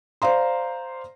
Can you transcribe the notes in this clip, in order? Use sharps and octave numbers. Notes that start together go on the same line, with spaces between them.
C5 D5 F5 A#5 C6